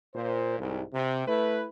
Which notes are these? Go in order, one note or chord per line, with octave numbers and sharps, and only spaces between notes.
A#2 C5
C2 G#2
C3
A3 E4 B4